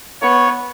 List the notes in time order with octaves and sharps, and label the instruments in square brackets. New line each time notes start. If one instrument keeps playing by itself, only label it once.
[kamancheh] B3 [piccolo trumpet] C#5